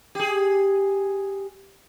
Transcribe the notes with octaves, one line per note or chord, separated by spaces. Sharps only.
G4 G#4